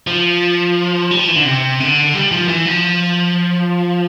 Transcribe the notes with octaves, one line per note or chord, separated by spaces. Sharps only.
F3
G3
F3
E3
D3
C3
D3
G3
F3
E3
F3